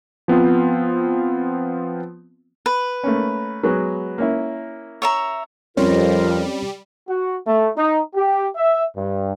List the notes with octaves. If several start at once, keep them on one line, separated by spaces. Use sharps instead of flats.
F3 B3 C4 F4
B4
A3 A#3 C#4
F#3 G#3 B3
A#3 C#4 E4
C#5 E5 A#5
F2 G3 C4 C#4 F4 A#4 C#5
F#4
A3
D#4
G4
E5
G2